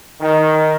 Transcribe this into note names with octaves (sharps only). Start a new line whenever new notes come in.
D#3